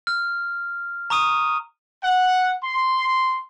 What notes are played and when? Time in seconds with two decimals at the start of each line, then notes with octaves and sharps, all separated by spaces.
0.07 F6
1.10 A#5 C#6 D#6 D#7
2.04 F#5
2.63 C6